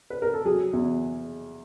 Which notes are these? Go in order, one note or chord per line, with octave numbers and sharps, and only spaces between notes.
B4
A#4
A4
F#3 G#4
E2